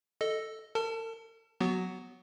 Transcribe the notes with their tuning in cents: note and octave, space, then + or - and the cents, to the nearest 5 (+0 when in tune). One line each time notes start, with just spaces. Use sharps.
A4 +0 D#5 +0
A#4 -45 A5 +10
F#3 -10 B3 +0 F#4 +15